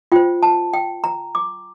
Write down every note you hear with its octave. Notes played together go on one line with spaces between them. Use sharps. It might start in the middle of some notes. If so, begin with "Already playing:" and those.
F4 C5 G5
A5
G5
A#5
D6